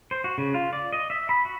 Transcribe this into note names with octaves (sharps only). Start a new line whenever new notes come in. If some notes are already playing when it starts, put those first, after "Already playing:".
C5
F#4
C#3
F4
D5
D#5
E5
B5
F#4